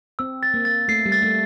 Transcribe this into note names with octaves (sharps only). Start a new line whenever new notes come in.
C4 E6
A6
A#3
A6
A3 C7
G3
A6
A3